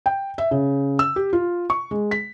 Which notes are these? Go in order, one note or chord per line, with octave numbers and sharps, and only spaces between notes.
G5
E5
C#3
E6
G4
F4
C#6
G#3
B6